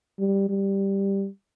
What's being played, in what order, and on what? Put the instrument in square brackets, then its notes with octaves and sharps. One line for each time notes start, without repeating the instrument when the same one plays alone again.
[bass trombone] G3
G3